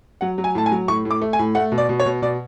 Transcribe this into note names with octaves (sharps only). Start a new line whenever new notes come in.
F#3 F#5
F#3
G#5
A2 A5
G#5
F#3
A2 C#6
A2
D6
A3
G#5
A2
A3 F#5
B2
D5
B2
C#5
B2
B2 D5